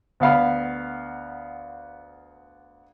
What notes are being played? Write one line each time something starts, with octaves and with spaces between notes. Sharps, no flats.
D2 B3 F5 B5